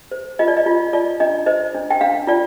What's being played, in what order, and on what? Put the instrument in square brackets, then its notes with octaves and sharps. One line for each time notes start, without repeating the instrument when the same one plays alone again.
[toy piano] C5
F4 D#5
D5
D#5
F4
F4 D5
D4 D#5
C5 D#5
D4
G5
D4 F5
F4 D5